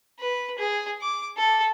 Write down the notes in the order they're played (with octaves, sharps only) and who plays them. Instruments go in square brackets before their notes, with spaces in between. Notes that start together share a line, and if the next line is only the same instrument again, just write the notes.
[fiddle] B4
G#4
D6
A4